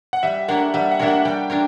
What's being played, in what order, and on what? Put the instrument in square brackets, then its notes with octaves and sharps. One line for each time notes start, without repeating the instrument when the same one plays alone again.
[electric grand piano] F#5
[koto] G3 [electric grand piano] E5
[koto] A#3 D4 A#4 C#5 [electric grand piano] F#5
[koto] G3 [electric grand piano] E5
[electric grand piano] F#5
[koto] A#3 D4 A#4 C#5 [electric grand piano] E5
[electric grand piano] F#5
[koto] G3 [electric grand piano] G5
[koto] D4 A#4 C#5